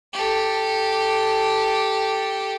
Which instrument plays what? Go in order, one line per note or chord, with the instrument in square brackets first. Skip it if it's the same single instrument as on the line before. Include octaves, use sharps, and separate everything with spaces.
[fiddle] G4 A4